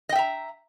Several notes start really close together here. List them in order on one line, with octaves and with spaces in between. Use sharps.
D#5 G5 E5 A#5